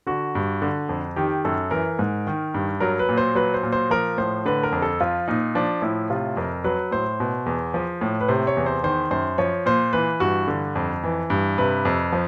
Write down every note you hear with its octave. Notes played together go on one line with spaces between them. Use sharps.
D3 F#4
G2
D3
F2
D#3 G4
F#2 A4
E3 A#4
G#2
D#3
G2
F#3 A#4
B4
A#2
C5
F#3 B4
C5
A#2
C5
F3 A#4
A2 C5
D3 B4
A#4
F2
A4
F3 F4
A#2 D#4
F3 D4
A2 E4
C3 F4
F2 A#4
F#3 B4
A2 C5
B2
E2
F3
A2
B4
C3 C5
C#5
E2
C5
D#3 C5
F#2 C5
F3 C#5
A#2 C5
E3 B4
G2 F#4
D3
F2
E3
G2
C3 B4
F2
F3